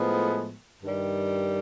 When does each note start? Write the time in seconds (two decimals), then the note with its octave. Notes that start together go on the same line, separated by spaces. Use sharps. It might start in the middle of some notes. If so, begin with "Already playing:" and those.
Already playing: A2 F3 G#3 B3
0.83 G2 D#3 G3